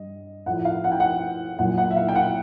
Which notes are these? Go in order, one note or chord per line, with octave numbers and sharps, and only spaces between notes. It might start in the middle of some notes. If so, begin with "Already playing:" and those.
Already playing: G2 G3 D#5
A2 F3 F#5
F5
F#5
G5
F#5
A#2 F#3 F#5
F#5
E5
F5
G5
F#5